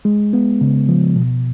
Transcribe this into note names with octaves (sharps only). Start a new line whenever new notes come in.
G#3
B3
C#3
F3
B2